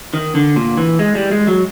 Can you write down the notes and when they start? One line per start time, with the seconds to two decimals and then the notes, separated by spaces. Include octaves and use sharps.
0.14 D#3
0.35 D3
0.56 A#2
0.78 E3
0.99 G#3
1.15 G3
1.31 G#3
1.47 F#3